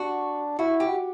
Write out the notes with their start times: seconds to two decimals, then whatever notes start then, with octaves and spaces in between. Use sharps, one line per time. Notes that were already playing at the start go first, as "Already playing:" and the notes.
Already playing: D4 F#4
0.59 E4 F#4
0.80 G4
0.88 F#4